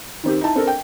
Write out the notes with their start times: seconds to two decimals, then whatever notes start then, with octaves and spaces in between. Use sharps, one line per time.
0.24 D#3 C4 G4
0.41 D#4 E4 A5
0.56 C4 D4 A4 A#4
0.67 G5